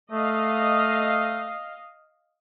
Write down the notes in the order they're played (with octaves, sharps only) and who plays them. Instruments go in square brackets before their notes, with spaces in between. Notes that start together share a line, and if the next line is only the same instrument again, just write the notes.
[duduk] A3 [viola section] D#5 F5